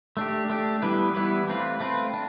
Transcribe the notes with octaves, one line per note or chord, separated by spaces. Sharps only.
A3 D4 G4
A3 D4 G4
E3 G3 B3 E4 B4
E3 G3 B3 E4 B4
A3 C4 F4 B4
A3 C4 F4 B4
D4